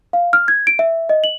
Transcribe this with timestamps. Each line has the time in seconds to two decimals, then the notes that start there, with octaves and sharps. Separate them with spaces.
0.13 F5
0.33 F6
0.48 G#6
0.67 D7
0.79 E5
1.09 D#5
1.24 F#7